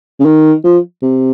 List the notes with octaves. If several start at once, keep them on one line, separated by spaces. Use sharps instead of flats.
C#3
D#3
F3
C3